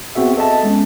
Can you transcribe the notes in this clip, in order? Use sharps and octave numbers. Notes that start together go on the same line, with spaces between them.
B3 C4 F#4 G#4 E5
A4 D#5 E5 A5
G#3 B3 C#4